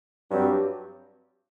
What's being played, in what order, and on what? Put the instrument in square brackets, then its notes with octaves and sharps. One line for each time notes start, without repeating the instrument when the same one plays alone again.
[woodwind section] G2 F#3 C4 G4